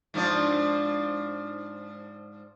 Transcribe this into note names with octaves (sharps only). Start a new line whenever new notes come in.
G#2 F3 D4